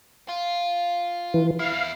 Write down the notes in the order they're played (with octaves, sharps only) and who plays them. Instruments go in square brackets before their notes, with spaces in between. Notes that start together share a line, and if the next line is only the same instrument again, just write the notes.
[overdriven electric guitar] F4
[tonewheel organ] E3
[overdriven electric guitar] E2 E4 [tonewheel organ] F5